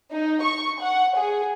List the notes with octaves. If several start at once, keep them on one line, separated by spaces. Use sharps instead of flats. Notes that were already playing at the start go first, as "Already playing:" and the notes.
D#4
C#6
F#5
G#4